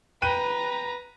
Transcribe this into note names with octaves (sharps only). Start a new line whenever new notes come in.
B4 G5 A#5 F#6 D#7